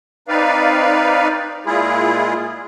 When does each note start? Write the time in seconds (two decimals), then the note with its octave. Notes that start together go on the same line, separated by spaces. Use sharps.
0.28 C4 D#4 B4 D5 F5
1.66 A#2 G#3 E4 F4 G#4